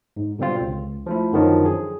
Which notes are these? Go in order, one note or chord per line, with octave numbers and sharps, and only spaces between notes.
G#2
B2 D3 G3 C4 F4
C#2
F3 A3 E4
F#2 D3 D#3 F3 F#3 D#4
G#4